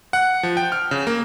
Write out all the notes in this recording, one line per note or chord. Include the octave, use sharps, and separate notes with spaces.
F#5
F3
G5
F6
C#3
A#3